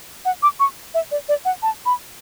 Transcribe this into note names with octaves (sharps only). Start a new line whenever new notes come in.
F#5
D6
C#6
E5
D5
D5
F#5
A5
B5